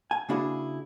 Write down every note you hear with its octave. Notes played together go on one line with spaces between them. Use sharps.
G#5
C#3 A#3 D4 E4 F#4 G#4